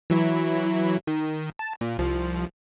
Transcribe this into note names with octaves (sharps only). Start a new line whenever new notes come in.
E3 F#3 E4
D#3
A5
A#2
C2 F3